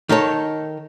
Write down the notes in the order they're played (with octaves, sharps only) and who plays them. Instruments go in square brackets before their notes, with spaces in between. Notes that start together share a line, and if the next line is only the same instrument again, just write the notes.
[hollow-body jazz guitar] D#3 D#4 A4 C#5